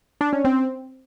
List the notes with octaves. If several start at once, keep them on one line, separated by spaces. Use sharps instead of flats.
D4
C#4
C4